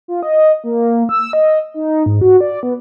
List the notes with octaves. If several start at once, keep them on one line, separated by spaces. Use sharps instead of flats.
F4
D#5
A#3
E6
D#5
D#4
G#2
F#4
D5
B3